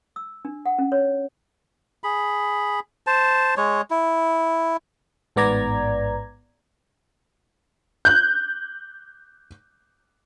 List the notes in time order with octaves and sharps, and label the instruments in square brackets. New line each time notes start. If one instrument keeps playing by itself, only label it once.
[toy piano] E6
D4
F#5
C#4
C#5
[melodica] G#4 B5
C5 A5
G#3 C#5
E4
[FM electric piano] A1 G#2 B3 D5 A#5 G#6
[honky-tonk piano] F#6 G6